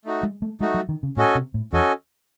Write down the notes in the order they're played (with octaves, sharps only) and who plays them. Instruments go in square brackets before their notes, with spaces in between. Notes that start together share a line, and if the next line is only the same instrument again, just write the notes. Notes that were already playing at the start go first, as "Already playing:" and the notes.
[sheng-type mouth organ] A3 D#4 F#4
[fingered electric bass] G#3
A3
[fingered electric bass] G#3 [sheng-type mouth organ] A3 D#4 F#4
[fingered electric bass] F#3
D#3
C#3
[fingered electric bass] A2 [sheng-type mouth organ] C#4 F#4 A4 D#5 G#5
[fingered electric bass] C3
A2
[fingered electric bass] E2 [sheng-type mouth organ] C#4 F#4 A4 D#5 G#5